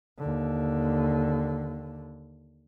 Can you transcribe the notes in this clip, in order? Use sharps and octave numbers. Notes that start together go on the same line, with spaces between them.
D#2 D3